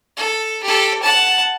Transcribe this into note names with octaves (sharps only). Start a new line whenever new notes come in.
A4
G4 A4
F#5 A5